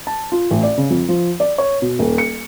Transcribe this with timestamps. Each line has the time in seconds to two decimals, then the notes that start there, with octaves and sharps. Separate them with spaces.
0.07 A5
0.32 F4
0.51 A1
0.63 D5
0.77 C#3
0.91 F2
1.09 F3
1.40 D5
1.58 C#5
1.82 B2
1.99 D#1
2.18 C#7